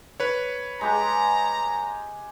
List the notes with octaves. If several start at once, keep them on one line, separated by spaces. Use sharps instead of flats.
B4 C#5
G#3 G4 A#5